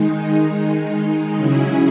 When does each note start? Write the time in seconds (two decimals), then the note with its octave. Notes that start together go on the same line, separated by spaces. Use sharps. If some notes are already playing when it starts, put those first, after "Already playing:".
Already playing: D#3 G#3 D#4
1.37 C#3 F#3 C#4 E4 G#4